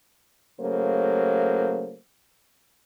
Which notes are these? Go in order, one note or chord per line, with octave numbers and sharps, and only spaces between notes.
C#3 F#3 A3 A#3 C5